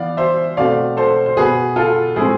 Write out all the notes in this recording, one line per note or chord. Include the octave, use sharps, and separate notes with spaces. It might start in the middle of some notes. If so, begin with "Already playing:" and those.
Already playing: E3 B3 D5 F5
C5 E5
B2 A3 C4 D5 F5
A4 C5
C5
B2 B3 G#4 B4
F4 A4
A2 F3 G#3 C4 E4 G#4